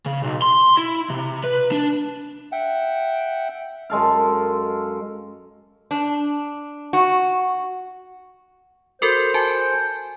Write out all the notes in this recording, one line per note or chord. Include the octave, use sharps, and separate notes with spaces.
C#3
B1
C6
E4
C3
B4
D4
E5 F#5 G5
F#2 G#3 A4 F5
D4
F#4
F#4 A4 A#4 C5
F#4 G#5 A5